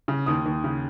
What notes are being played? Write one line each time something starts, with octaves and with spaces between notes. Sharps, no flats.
C#3
D#2 D#6
D#2
C#3